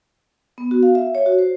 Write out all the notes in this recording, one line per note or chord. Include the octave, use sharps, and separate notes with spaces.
B3
F#4
F5
E5
C#5
F#4
C5